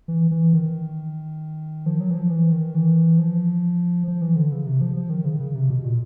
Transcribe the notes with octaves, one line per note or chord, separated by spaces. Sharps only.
E3
E3
D#3
F3
F#3
E3
F3
E3
D#3
E3
F3
F3
E3
D3
C#3
C3
F3
F3
D#3
C#3
C#3
C3
B2
A#2